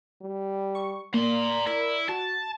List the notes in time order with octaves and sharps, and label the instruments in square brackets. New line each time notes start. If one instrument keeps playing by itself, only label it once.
[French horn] G3
[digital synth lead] C#6
[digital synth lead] A#3 [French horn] D5 [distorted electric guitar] A#5 C6
[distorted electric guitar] E4 [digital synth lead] A#4
[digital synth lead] F#4 [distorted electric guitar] A5